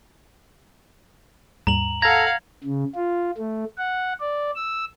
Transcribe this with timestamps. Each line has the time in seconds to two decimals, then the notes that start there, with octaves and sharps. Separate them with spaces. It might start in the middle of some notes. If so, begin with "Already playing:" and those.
1.67 D#2 G#2 G3 A#5 F#7
2.02 A4 F5 F#5 A#5 G#6 A#6
2.64 C#3
2.95 F4
3.38 A3
3.78 F#5
4.21 D5
4.56 E6